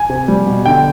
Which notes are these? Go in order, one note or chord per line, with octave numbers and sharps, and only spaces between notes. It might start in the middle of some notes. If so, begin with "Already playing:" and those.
Already playing: G#5
C3
G3
B2
D3 G5